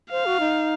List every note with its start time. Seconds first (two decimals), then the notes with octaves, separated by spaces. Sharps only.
0.11 C5 F5
0.26 F#4
0.40 D#4